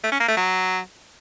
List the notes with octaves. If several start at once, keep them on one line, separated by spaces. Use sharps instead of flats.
A3
C#4
A#3
A3
F#3